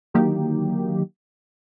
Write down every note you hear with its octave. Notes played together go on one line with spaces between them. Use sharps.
D3 D#3 F#3 A#3 D#4 G4